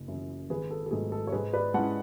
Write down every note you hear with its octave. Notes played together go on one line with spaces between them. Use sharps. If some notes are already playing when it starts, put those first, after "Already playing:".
Already playing: F#1
F#2 E3
G#1 G#4 B4
A4
A4
G#2 F#3 A3 G#4
A4
C#5
G#2 G#4 B4
B4 D5
G#3 C#4 E4 F#5 A5